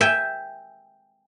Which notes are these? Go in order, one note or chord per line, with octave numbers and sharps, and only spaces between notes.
E5 G5 G#5